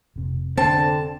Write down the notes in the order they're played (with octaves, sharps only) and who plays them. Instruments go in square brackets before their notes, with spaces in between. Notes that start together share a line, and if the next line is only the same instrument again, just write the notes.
[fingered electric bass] F1 C3
[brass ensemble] D3 [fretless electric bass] C4 [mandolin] A5